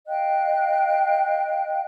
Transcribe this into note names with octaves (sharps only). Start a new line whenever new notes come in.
D#5 F5 G5 F#6